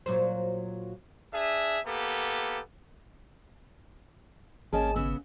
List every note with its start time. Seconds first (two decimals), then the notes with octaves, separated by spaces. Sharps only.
0.06 A#2 F#3 C5
1.33 D4 G#4 E5
1.86 A#3 B3 G4 A4
4.73 G#1 A#3 C#4 G#4 D#5 G#5 A5
4.96 C#3 B3 E6